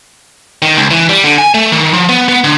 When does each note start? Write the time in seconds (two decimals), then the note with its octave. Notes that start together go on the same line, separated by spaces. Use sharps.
0.62 D#3
0.77 C#2
0.91 E3
1.09 G3
1.23 D3
1.38 G#5
1.54 A3
1.72 D#3
1.94 F3
2.09 B3
2.29 B3
2.44 D3